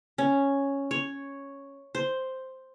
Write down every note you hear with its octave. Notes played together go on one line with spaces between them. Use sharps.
C#4
C#5
C5